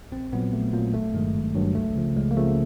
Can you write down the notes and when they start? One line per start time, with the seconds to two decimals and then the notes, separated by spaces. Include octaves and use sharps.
0.12 A#1 C4
0.32 A#2 F#3 B3
0.52 A#1 A3
0.73 A#2 F#3 A#3
0.94 G#1 A3
1.14 G2 D#3 F#3 G#3
1.34 G#1
1.55 G2 D#3 F#3
1.75 C#2 A3
1.95 C#3 F3
2.16 C#2 G#3
2.31 A#3
2.37 C#3 F3 A3